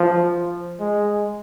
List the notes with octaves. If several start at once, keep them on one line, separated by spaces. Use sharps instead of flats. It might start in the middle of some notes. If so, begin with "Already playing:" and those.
Already playing: F3
G#3